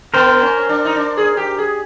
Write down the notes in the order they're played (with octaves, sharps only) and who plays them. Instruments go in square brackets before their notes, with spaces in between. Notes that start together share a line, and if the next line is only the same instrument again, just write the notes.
[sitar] B3 [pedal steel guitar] A#4 C5
[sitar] C#4
D4
D#4
D4
G#4
G4
G#4